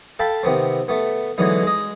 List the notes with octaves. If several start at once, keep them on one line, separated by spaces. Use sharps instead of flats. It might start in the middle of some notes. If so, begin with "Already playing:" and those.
A4 F5 G5 A5 B5
C3 D#3 B3 C4
A3 B3
D3 E3 F#3 G#3 B3 D#4
G#3 D#5